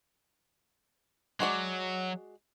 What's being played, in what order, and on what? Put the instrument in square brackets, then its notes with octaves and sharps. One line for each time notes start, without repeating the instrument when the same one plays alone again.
[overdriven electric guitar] F#3 [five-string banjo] G#3 F#4 D5